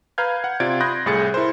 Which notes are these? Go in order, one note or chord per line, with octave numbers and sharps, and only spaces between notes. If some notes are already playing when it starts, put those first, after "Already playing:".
B4 F5 A#5 F6 G6 G#6
F#5
C3 F4 D5 G#6 A6 D7
B5 C6 D#6 F#6 G6 A#6
C2 A2 E4 G#4 A6 C#7
E4 A#4 C5